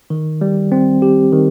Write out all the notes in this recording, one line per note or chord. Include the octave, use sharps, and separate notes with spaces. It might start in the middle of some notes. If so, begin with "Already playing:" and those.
D#3
G3
C4
G4
D#3